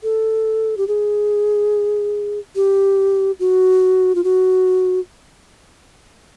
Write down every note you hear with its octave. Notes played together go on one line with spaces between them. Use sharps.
A4
G4
G#4
G4
F#4
F4
F#4